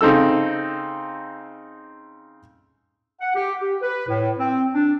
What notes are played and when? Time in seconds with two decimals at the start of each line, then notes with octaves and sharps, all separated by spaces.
0.01 C#3 C4 D#4 A4 E6
3.20 F#5
3.35 G4
3.60 G4
3.81 B4
4.08 A2
4.38 C4
4.74 D4